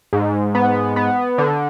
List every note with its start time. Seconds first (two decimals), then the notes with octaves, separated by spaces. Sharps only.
0.13 G#2
0.55 B3
0.96 B3
1.38 D3